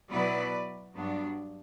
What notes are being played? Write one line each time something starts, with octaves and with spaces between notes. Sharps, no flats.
B2 F#3 B3 E4 B4 D5
G2 F#3 B3 D4